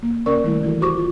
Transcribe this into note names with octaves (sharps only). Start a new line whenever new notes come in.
A#3
C3 C#4 A#4 D5 C#6
D#3 G3 A3 E4
E3 E4 F#4 A4
F#4 G4 C5 C#6 D6
F4